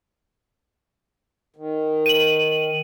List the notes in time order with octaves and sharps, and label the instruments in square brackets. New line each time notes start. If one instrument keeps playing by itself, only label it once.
[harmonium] D#3
[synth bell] D#7 F#7